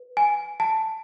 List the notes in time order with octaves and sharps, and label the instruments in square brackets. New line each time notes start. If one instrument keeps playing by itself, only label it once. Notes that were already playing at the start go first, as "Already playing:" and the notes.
Already playing: [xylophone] B4
G#5
A5